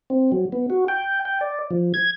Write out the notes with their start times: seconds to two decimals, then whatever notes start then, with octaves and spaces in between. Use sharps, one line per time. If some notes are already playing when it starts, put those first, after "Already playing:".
0.10 C4
0.32 F#3
0.52 B3
0.70 F#4
0.88 G5
1.25 G5
1.41 D5
1.71 F3
1.94 G#6